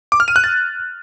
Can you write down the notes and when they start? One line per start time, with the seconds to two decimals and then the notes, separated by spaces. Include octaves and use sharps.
0.12 D6
0.20 F6
0.28 D#7
0.36 F#6
0.44 A6